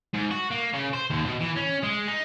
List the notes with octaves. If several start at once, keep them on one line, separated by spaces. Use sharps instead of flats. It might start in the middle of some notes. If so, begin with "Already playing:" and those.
G#2
F#4
A#3
C#3
C5
D#2
B2
E3
C#4
G#3
D#4